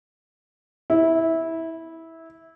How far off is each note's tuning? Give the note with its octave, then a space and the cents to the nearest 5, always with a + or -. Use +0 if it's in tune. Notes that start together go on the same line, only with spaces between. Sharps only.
E4 -15